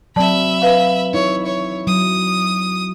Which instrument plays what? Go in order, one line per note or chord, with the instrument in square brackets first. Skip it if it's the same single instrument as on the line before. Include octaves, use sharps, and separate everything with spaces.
[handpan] F#3 C4 [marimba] D5 A5 [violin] E5 B5
[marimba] B4 F5
[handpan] D#4 E4 E5 [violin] C#5
[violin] C#5
[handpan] F#3 [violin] D#6